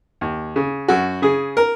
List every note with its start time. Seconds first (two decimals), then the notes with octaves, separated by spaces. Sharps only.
0.21 D#2
0.56 C#3
0.88 F#2 F#4
1.22 C#3 G#4
1.57 A#4